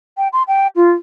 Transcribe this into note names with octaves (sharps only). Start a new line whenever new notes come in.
G5
C6
G5
F4